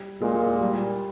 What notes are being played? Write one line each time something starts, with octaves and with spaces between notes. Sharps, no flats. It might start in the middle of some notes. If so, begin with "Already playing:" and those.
Already playing: G3
A#2 G#3
G3